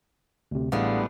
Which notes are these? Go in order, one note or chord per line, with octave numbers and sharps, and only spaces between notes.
D2 C3
A1 A2 D3 G3 G#3 B3 F5